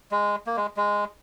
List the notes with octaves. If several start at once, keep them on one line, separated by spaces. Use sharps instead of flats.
G#3
A#3
G#3
G#3